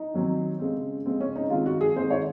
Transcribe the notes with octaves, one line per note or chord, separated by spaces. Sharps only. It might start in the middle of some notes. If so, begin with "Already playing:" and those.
Already playing: D#4
D#3 F#3 C4
C#3 G#3 C4
C#3 G#3 C4
C#4
D#4
D#3 G#3 C4 F4
F#4
G#4
D#3 G#3 C4 C5
C#5